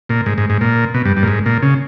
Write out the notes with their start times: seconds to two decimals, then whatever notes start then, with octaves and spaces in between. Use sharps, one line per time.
0.09 A#2
0.26 G#2
0.38 G#2
0.50 G#2
0.61 A#2
0.94 B2
1.05 G2
1.17 G2
1.23 A#2
1.28 G#2
1.46 A#2
1.63 C#3